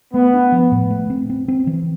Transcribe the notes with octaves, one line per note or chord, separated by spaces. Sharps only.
A3 B3
D4
F3
A2
A3
C4
C4
C4
E3